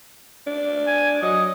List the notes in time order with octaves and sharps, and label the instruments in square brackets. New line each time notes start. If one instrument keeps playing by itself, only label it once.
[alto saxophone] D4
[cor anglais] G#5
[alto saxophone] F#3 [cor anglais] D#5